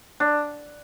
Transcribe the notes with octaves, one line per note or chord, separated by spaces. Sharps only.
D4